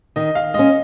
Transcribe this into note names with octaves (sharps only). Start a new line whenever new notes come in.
D#3 D#5
F5
G#3 C#4 D#5